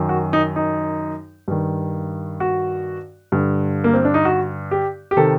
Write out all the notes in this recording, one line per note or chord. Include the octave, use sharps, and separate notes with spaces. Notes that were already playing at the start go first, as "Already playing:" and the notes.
Already playing: F#2 D#3
F#4
D#4
D#4
G2 D#3
F#4
G2 D3
A#3
C4
D4
D#4
F#4
G4
G4
C3 D#3 A4